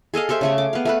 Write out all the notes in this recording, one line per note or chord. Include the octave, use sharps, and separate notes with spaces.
G#4 A4 D#5 F5
G4 A4 C5 E5
C#3 A3 G#4
D6
B3 F5
A3 A4 B4